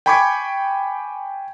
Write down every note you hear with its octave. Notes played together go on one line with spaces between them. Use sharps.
G5 G#5 B5 C#6 D6 G#6